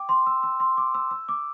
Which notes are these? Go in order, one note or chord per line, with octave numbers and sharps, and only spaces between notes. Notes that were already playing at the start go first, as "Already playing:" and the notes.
Already playing: G5 D6
C6
E6
E6
C6
D6
E6
E6
D6